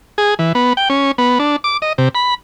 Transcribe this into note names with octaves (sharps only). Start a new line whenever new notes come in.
G#4
E3
B3
G5
C#4
B3
D4
D6
D#5
C3
B5